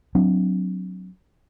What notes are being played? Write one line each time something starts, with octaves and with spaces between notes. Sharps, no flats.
F#3 C4 D4